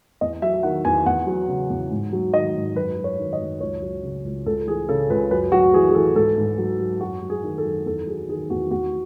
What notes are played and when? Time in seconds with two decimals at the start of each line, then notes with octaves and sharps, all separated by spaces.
0.21 E2 D#5
0.42 F#3 E5
0.63 D#3 F#5
0.85 E2 G#5
1.06 E2 F#5
1.27 F#3
1.48 C#3
1.70 E2
1.91 G#2
2.13 F#3
2.33 D#3 D#5
2.55 G#2
2.75 F#2 B4
2.97 F#3
3.04 C#5
3.19 D#3
3.33 D#5
3.40 F#2
3.61 C#2 C#5
3.82 F#3
4.03 C#3
4.25 C#2
4.46 C#2 A4
4.67 E3 G#4
4.89 C#3 A4
5.10 C#2 B4
5.31 F#2 B4
5.52 F#2 F#4
5.74 E3 G#4
5.89 G#4
5.95 E3 A4
6.16 G#2 A4
6.38 G#2
6.58 F#3
6.80 F#3
7.01 F#2 F#4
7.22 F#3
7.30 G#4
7.44 D#3
7.58 A4
7.66 F#2
7.86 E2 A4
8.07 F#3 G#4
8.29 D#3 G#4
8.50 E2 F#4
8.71 E2 F#4